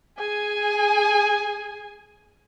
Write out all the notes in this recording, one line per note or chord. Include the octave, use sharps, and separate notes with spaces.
G#4 G#5